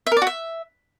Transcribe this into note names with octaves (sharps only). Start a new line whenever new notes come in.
E5
A#4
D5
F#4
E5